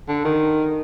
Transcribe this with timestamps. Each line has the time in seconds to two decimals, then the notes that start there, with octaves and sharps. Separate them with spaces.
0.08 D3
0.25 D#3